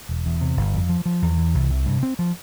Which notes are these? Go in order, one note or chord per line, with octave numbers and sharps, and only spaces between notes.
E1
E2
C3
G1
F2
F3
F3
E2
E3
C2
C3
G2
C4
F3